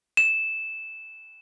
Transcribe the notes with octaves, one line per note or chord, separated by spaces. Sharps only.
E7